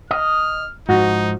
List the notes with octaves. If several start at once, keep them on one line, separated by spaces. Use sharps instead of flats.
D#5 F6
G#2 F3 D#4 F#4